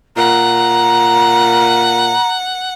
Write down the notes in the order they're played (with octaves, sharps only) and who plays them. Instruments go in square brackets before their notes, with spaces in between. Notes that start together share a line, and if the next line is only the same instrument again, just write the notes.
[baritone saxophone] A#2 [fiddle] F#5 [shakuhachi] A#5